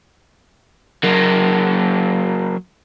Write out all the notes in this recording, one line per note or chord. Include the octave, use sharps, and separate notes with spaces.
F#3 A#3